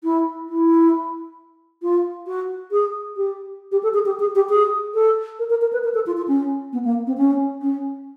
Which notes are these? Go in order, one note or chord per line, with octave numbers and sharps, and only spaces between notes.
E4
E4
F4
F#4
G#4
G4
G4
A4
G#4
G4
G#4
G4
G#4
A4
A#4
A#4
A#4
B4
A#4
A4
F4
F4
C#4
B3
A#3
C4
C#4
C#4